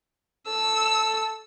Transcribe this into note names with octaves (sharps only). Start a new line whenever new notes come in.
A4 E6